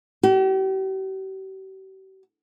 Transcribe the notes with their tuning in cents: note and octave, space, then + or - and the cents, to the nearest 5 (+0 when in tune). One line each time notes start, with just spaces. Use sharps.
G4 -40